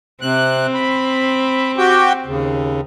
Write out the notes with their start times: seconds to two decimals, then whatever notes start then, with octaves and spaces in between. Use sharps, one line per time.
0.21 C3 C4 F#6
0.74 B5
1.78 F#4 G4 G5
2.26 D#2 C#3